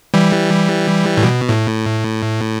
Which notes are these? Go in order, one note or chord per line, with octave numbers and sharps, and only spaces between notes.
E3 G3
A2
B2
A2